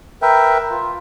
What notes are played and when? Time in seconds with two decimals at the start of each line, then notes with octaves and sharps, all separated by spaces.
0.22 A#4 B4 E5 G5
0.70 F4